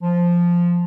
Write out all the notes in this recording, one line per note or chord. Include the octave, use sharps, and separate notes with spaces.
F3